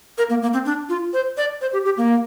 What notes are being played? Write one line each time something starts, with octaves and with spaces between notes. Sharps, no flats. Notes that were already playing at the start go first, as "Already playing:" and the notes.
A#4
A#3
A#3
C4
D4
F4
C5
D5
C5
G4
G4
A#3